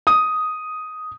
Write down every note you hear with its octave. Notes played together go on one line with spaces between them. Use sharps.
D#6